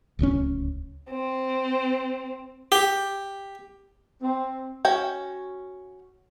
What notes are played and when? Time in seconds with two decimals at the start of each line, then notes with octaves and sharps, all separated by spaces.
0.19 D1 C#2 C#3 C#4
1.11 C4
2.72 G4
4.23 C4
4.85 C#4 F#4 G5